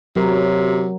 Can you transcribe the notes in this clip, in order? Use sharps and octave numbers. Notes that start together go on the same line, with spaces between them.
C3 F#3 A#4